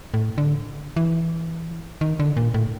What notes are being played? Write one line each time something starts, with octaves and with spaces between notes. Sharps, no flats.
A2
D3
E3
D#3
D3
A#2
A2